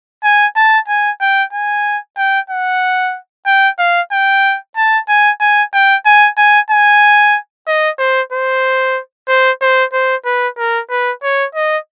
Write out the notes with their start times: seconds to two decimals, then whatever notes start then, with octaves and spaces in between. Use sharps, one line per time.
0.24 G#5
0.56 A5
0.88 G#5
1.21 G5
1.53 G#5
2.17 G5
2.50 F#5
3.46 G5
3.79 F5
4.12 G5
4.77 A5
5.09 G#5
5.40 G#5
5.74 G5
6.06 G#5
6.37 G#5
6.70 G#5
7.67 D#5
7.99 C5
8.32 C5
9.29 C5
9.62 C5
9.93 C5
10.25 B4
10.58 A#4
10.90 B4
11.23 C#5
11.55 D#5